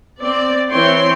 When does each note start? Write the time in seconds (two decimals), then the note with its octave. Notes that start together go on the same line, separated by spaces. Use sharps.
0.22 C4 D5
0.69 E3 C4 C#5 G5 C6